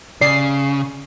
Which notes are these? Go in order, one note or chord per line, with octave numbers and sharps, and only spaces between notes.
C#3 D5 C7